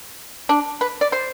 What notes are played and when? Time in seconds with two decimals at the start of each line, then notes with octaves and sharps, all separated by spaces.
0.49 D4
0.81 B4
1.01 D5
1.12 C5